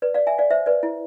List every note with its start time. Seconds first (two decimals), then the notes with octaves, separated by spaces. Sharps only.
0.02 B4 D5
0.14 D5 F5
0.27 E5 G#5
0.38 D5 F5
0.51 C5 E5
0.66 B4 D5
0.83 E4